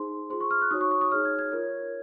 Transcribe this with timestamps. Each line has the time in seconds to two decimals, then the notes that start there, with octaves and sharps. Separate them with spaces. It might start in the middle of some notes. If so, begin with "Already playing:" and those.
Already playing: D#4 G#4 C5 C6
0.30 F4 G#4 C5 C6
0.41 C#6
0.51 F6
0.61 F#6
0.71 D#4 F#4 C#5 D#6
0.81 C#6
0.91 C#6
1.01 D#6
1.11 D#4 G#4 C#5 F6
1.25 G#6
1.39 G#6
1.52 F4 A#4 C#5